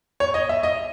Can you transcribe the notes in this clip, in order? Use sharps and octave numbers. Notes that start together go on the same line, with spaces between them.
C#5
D#5
E5
D#5